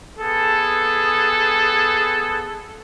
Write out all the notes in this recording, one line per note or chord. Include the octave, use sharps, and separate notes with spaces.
B3 G#4 A4